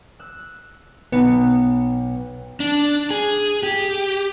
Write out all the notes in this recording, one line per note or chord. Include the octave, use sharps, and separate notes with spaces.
E6 F#6
B1 B2 B3
D4
G#4
G4